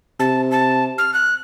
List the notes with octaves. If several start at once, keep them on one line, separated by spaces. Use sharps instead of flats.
C3 A5
A5
F6
F#6